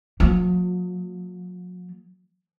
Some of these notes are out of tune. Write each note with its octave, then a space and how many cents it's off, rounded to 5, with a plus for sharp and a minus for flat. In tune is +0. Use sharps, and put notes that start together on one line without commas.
F#3 -45 A#3 -40